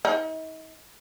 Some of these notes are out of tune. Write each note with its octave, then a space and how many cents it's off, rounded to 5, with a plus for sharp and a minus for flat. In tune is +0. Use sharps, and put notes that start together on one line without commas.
D#4 +40